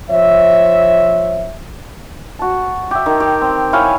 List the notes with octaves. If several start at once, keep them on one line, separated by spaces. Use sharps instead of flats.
F3 C5 C#5 E5
F#4 A5
G4 E5
D#3
G4
C4
E4 C#5 F5 G#5